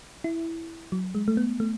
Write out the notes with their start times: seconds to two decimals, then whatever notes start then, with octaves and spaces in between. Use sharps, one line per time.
0.24 E4
0.92 F#3
1.15 G#3
1.28 A3
1.37 B3
1.60 A3